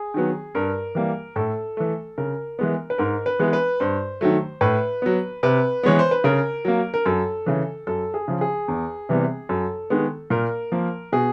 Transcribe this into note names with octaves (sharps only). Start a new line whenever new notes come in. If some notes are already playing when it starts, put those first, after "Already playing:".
Already playing: G#4
D#3 F#3 B3
G2 A#4
E3 G3 A#3
A2 A4
E3 A3
C#3 A#4
E3 G#3 B3
B4
G#2 A#4
B4
E3 G#3 B3
B4
G2 C5
D#3 F#3 A3
A2 B4
F#3 B3
C3 B4
E3 G#3 B3 C#5
C5
B4
C#3 A#4
F#3 A#3
A#4
F#2 A4
C#3 E3
F#2 A4
G#4
C#3 F3
G#4
E2
C3 E3 G3 B3
F#2 A4
D#3 G#3 B3
A#2 A#4
F3 A#3
B2 G#4